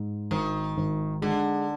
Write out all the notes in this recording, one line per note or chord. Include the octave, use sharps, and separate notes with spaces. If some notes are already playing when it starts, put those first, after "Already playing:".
Already playing: G#2
G#1 D#3
G#1
D3 G#3